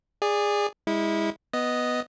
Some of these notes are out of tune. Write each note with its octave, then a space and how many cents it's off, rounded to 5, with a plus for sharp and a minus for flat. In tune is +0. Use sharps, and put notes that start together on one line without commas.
G#4 -15 D5 +0
G#3 -30 E4 -25
B3 +0 D#5 +0